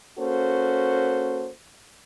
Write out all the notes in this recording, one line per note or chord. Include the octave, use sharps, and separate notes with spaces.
A#3 C#4 F#4 A4 C5